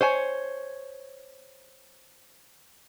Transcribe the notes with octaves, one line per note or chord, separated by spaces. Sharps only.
C5 C#5 G#5